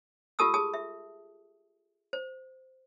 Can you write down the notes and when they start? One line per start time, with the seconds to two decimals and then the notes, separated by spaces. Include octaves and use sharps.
0.39 F4 G4 A4 A5 D#6 E6
0.54 G#4 A5 D#6
0.74 E5
2.13 C5